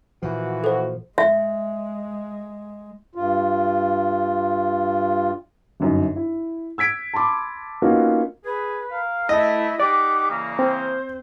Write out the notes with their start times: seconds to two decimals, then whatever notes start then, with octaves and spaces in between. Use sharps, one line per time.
0.22 A#2 E3 F3 A#3 F#4
0.64 A4 C5
1.18 G#3 E5
3.15 G2 F4
5.80 G1 F#2 D#4
6.16 E4
6.78 E6 G#6 B6 D7
7.13 A5 B5 C6 D6
7.82 A#3 B3 C#4 D#4 F4 F#4
8.45 G#4 B4
8.90 A#4 F5
9.29 A3 E4 D#5
9.80 D#4 G4 D5 F#5 D6
10.29 C#3 E3 A#3
10.59 C4 C5